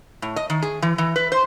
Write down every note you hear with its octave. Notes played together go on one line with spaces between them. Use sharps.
A2
D#5
D#3
G#4
E3
E3
B4
C5